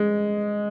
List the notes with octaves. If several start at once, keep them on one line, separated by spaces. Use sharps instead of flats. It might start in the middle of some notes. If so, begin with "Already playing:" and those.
Already playing: G#3